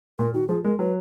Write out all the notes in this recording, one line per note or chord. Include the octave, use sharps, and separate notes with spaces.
A#2 A#4
D#3 F#4
F3 G#4
G#3 A#4
F#3 B4